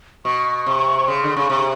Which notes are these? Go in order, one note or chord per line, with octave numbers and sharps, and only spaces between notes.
B2 C#6
C3
C#3 C6
D3
C#3 C#6
C3